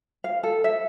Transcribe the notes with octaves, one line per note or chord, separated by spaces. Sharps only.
F5
A4
E5